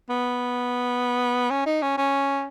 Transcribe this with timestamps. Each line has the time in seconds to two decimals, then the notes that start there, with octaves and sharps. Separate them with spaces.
0.10 B3
1.51 C#4
1.66 D#4
1.82 C#4
1.98 C#4